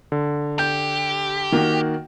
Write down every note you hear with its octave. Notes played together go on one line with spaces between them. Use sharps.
D3
G4 G6
D#3 A#3 F#4